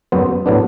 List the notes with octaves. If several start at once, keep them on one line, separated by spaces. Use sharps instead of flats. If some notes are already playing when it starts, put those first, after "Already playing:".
F#2 F#3 B3 C5
A2 F#3 B3 D4